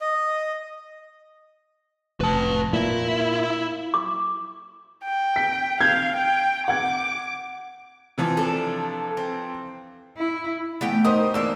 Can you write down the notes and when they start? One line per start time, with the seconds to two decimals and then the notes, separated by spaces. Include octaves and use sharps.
0.01 D#5
2.21 F1 B4 A5
2.73 A#2 E4 E5
3.94 D6
5.04 G5
5.36 B6
5.80 F5 G6 G#6
6.16 G5
6.68 F#5 D6 G#6
8.18 C3 E3 F3
8.37 D4 A4
9.17 C4
10.17 E4
10.81 E3 A3 B3 G4 G5
11.05 D#3 A#4 C5 D#5 D#6
11.34 E3 A#3 D4 E6